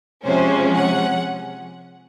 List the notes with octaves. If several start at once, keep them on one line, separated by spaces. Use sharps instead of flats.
C3 F3 G#3 C#4 C5
F#5